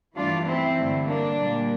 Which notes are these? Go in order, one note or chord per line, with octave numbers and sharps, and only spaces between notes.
G2 E3 A3 D4 F4
C4 E4
G2 D3 A3
A#3 D4
A#2 G3 A#3